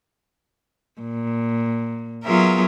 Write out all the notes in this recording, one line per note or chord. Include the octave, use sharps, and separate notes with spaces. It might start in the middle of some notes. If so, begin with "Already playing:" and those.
A#2
F#3 B3 F4 G#4 A#4 E5